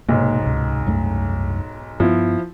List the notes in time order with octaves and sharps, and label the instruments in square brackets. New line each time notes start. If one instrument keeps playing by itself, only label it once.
[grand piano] B1 G#2 [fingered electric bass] C3 A#3
[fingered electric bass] C#2 C3
C2 F#2 A3
[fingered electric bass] G2 B3 [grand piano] F3 E4